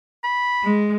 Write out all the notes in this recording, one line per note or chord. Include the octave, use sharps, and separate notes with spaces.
B5
G#3